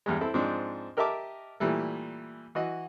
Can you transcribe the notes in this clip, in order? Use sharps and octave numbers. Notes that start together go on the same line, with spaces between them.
E2 G2 G3 G#3
C4 E4 A4
G#2 F3 C4 D4 G#4
G4 A#4 D#5 E5 A5 D6
A#2 E3 G3 A3
E3 F#4 D#5